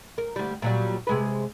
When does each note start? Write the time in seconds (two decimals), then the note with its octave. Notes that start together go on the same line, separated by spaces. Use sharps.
0.18 A#4
0.36 D2 G3
0.62 A#2 F#3 G3
1.07 C3 G#3 B4